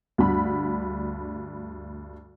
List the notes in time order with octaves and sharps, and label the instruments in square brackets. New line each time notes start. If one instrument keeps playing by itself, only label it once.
[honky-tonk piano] D2 G2 B5